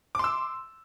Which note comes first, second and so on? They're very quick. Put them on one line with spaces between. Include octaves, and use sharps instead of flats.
D6 C6 E6